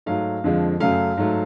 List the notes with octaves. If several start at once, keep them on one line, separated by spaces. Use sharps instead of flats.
G#2 F#3 A3 F5
F2 D3 F3 G#3
F#2 C#3 F#3 A3 F5
G#2 F#3 A3